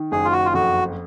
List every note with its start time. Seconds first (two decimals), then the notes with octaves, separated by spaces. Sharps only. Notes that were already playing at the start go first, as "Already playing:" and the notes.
Already playing: D#3
0.12 F#1 G#4
0.25 F4
0.32 F#4
0.45 F4
0.54 F2 F#4